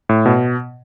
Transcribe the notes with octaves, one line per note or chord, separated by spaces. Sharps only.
A2
B2